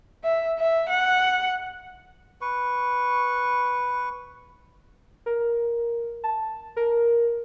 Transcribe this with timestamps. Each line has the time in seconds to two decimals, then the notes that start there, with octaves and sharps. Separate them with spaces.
0.24 E5
0.58 E5
0.90 F#5
2.41 B4 C#6
5.26 A#4
6.24 A5
6.76 A#4